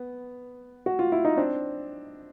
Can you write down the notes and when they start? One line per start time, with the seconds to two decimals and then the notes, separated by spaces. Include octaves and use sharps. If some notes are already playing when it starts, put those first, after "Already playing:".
Already playing: B3
0.86 F#4
0.99 F4
1.12 E4
1.25 D#4
1.37 C4 D4